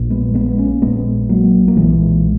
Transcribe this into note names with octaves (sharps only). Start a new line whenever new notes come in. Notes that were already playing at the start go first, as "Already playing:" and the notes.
Already playing: A#1 A#2
G#3 B3
G#3 B3
A#3 C#4
A#1 A#2 G#3 B3
F#3 A#3
A#3
B1 A#2 E3 G#3